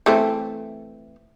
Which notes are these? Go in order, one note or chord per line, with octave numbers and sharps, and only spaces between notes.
E3 A3 C4